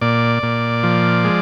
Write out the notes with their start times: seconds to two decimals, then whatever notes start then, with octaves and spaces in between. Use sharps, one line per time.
0.01 A#2 D5
0.43 A#2
0.83 F3
1.24 G#3